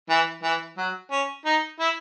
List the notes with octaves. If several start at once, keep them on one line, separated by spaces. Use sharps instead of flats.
E3
E3
F#3
C#4
D#4
E4